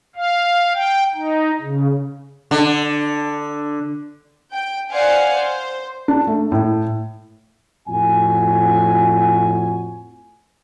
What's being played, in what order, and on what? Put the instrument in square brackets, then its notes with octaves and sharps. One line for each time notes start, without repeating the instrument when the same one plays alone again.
[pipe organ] F5
G5
D#4
C#3
[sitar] D3
[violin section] G5
C5 D5 F5 F#5 G#5
C5
[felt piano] D4
A3
A2
[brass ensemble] F2 A2 F#4 G#5